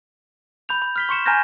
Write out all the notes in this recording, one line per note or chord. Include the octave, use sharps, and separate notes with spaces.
B5 G6 F7
B5
F6 B6 G7
C6 C#6 C#7 E7
G#5 A#5 F6 G6 G#6 A#6